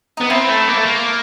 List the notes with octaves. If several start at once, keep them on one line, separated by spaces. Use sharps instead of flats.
B3 D#4
C4 E4
A3
A#3
A3
A#3